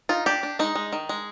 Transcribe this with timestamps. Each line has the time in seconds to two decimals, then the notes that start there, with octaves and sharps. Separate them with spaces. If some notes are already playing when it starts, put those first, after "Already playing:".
0.09 D#4 F4
0.26 D4 G4
0.43 D4
0.59 G#3 D#4
0.75 G#3
0.93 D#3
1.09 G#3